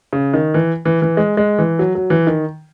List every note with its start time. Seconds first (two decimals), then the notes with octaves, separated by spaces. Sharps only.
0.13 C#3
0.34 D#3
0.54 E3
0.85 E3
1.02 E3
1.17 G#3
1.37 G#3
1.59 E3
1.79 F#3
1.95 F#3
2.10 E3
2.27 D#3